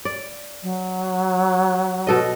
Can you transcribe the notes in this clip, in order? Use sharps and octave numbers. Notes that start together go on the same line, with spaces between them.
D5
F#3
B2 A4 D#5